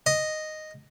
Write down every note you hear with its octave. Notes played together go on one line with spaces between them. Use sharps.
D#5